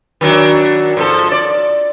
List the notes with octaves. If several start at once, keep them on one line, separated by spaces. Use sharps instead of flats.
D#3 F#3 D4
G#2 F3 A4
D5